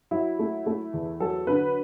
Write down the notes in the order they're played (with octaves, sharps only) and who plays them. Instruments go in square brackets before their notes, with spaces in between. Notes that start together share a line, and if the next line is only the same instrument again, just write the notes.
[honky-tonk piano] F#3 E4
A3
A3
E2
F#3 A4
D3 B4